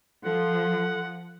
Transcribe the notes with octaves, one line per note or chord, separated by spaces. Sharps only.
F3 A4 F#5